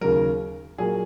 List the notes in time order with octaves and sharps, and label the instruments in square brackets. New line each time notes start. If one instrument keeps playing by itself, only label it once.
[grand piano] D#2 C#3 F#3 A#4
A#2 F#3 A#3 G#4